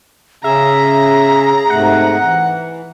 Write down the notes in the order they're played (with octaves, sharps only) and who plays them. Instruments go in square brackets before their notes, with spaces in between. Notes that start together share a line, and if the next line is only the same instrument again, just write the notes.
[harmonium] C#3 C#4 [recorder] G#4 [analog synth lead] E5 [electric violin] A#5
[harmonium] G#2 C3 A3 [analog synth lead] F#5
[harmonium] E3